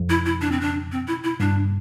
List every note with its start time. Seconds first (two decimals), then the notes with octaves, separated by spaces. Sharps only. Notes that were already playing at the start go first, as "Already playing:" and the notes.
Already playing: F2
0.10 E4
0.26 E4
0.41 D4
0.52 C4
0.61 D4
0.92 C4
1.08 E4
1.24 E4
1.40 G2 D4